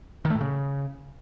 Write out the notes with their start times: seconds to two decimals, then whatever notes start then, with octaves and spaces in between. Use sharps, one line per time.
0.25 D#3
0.30 A3
0.35 A2
0.41 C#3